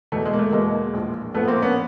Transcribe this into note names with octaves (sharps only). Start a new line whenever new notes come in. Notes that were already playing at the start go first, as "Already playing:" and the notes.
E2 B2 A3
G#3
A#3
A3
E2 B2 G#3 A#3
A#1 A2 F3
A#1 A2 F3 A3 B3
A#3 C4
B3 C#4